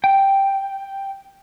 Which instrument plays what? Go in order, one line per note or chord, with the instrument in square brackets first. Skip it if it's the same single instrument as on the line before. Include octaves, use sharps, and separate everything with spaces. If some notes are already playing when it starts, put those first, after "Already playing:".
[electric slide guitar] G5